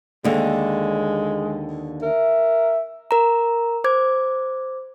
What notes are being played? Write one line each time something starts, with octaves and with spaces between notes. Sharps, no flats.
D#2 D3 G#3
A#4 E5
A#4 A#5
C5 D6 G#6